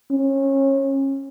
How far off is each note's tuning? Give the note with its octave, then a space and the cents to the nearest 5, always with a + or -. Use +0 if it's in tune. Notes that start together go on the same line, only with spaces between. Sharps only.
C#4 -30